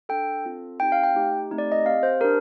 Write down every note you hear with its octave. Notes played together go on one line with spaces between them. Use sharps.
D4 A4 G5
C4 F4 A4
C4 D#4 G4 G5
F5
G5
A3 D#4 G4
A3 C4 D#4 G4
D5
D#5
C4 G4 F5
C5
D4 G4 A#4